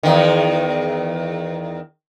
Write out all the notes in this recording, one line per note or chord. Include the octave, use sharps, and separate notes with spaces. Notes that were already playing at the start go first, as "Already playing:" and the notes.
E2 D#3